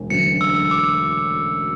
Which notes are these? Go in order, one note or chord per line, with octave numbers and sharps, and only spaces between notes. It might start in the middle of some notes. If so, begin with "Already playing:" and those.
Already playing: E1 D2
E1 D2 D3 F#3 C#4 C#7
E6
D6